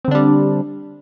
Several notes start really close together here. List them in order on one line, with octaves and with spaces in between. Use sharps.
C4 D3 D4 G3